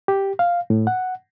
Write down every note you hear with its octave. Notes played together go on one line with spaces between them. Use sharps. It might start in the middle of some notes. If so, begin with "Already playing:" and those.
G4
F5
A2
F#5